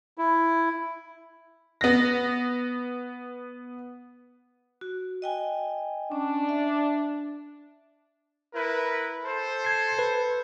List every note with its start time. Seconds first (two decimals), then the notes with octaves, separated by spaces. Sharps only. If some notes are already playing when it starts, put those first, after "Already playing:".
0.18 E4
1.81 B3 A#6
4.81 F#4
5.22 D#5 G5 G#5
6.12 C#4 D4
6.49 E5
8.53 E4 A#4 B4
9.24 A4 C5
9.65 G#6 C7
9.99 B4